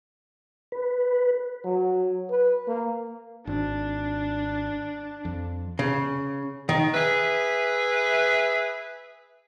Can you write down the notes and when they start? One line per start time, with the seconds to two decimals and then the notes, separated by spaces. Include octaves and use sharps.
0.72 B4
1.64 F#3
2.30 B4
2.68 A#3
3.47 G#1 D4
5.25 F2
5.79 C#3
6.69 D#3
6.94 G#4 B4 E5